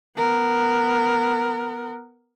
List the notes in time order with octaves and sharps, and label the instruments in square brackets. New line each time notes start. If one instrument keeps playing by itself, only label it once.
[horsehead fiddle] B3 A#4